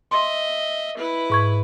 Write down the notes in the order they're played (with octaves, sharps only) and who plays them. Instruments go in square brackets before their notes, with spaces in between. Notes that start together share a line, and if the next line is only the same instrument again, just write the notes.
[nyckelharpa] D#5 E5 [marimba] C6
[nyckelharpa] E4 B4
[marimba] G#2 C#6 G#6